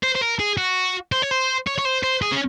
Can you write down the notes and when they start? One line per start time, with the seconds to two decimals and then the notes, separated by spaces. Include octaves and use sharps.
0.03 C5
0.15 C5
0.22 A#4
0.40 G#4
0.58 F#4
1.12 C5
1.22 C#5
1.31 C5
1.67 C#5
1.78 C#5
1.85 C5
2.03 C5
2.22 G#4
2.32 C#4